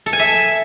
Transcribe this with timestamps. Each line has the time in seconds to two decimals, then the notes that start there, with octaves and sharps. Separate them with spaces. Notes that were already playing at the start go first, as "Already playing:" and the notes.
0.06 A4
0.13 G#5
0.19 E5